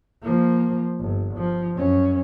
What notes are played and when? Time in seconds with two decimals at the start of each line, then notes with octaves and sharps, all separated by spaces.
0.22 F3 A#3
1.00 G1
1.37 F3
1.75 F#2 C#4